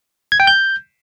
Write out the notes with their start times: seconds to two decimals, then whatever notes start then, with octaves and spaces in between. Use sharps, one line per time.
0.32 G#6
0.40 G5
0.47 G6